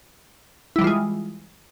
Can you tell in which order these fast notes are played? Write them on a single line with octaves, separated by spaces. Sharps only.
E4 G3 E3 F4 G#3